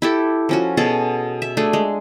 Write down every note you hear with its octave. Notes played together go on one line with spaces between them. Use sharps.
E4 G4 A4
F3 C#4 F#4
B2 G#4 A4
E5
A3 D4 G#4
G#3